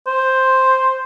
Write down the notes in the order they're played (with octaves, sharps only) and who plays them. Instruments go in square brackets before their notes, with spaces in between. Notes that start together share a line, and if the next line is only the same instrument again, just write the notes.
[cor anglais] C5